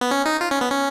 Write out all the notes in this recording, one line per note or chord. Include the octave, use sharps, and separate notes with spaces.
B3
C#4
D#4
F4
C#4
B3
C#4